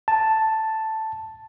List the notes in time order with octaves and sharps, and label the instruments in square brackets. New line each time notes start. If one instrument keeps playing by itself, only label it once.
[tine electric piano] A5